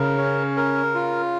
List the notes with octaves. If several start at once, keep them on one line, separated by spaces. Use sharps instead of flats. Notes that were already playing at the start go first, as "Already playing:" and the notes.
Already playing: C#3 A#4
C#4
A#4
F4